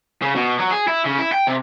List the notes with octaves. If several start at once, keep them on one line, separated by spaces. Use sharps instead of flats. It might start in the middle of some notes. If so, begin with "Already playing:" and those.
C#3
B2
F#3
G#4
E4
C#3
E4
G5
C3